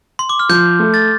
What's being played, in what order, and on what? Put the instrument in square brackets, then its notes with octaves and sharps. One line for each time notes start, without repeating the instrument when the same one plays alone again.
[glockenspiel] C6
D6
F6
[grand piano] F3 [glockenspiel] G6
[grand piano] A3
[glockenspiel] A6